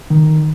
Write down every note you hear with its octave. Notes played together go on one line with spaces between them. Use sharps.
D#3